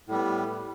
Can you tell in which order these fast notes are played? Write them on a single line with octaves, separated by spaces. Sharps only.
A2 G3 B3